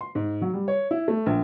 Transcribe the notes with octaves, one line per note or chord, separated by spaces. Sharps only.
C6
G#2
F#3
G3
C#5
E4
A3
A#1